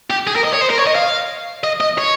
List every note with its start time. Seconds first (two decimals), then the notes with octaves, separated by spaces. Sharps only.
0.10 G4
0.27 G#4
0.36 A#4
0.45 D#5
0.53 C#5
0.61 C5
0.71 A#4
0.78 C#5
0.87 D#5
0.96 F5
1.64 D#5
1.81 D#5
1.98 C#5